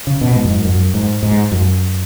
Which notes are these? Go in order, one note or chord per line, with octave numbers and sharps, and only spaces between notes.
C#3
B2
G#2
F#2
G#2
F#2
G#2
G#2
F#2